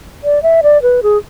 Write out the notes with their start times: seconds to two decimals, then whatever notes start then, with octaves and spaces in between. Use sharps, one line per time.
0.24 D5
0.43 E5
0.63 D5
0.82 B4
1.03 G#4